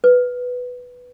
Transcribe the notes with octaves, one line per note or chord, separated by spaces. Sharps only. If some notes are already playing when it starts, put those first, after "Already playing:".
B4